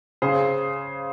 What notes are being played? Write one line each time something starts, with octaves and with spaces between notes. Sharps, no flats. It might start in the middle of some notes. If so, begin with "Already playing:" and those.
C#3 G#4 C5